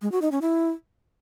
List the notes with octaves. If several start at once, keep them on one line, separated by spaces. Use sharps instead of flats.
G#3
F#4
D#4
C#4
E4